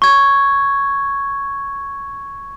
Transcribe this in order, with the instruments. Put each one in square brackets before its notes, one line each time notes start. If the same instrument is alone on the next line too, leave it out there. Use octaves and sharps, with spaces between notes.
[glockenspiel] C#6 G#6